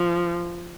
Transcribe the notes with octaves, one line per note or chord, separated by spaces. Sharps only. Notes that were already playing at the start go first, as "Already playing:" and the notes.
Already playing: F3